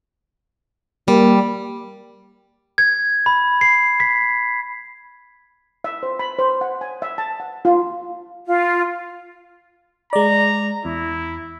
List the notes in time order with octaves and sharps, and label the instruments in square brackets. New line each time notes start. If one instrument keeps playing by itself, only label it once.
[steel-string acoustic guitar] G3 [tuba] A#3
[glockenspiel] G#6
B5
C7
B6
[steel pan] E5
C5
B5
C5
F#5
G#5
E5
A5
F#5
F4
[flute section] F4
[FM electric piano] G#3 D5 [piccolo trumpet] A#5
[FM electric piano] E2 [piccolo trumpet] E4